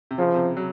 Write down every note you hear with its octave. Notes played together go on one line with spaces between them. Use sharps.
C3
C#3 F3
C3
F#3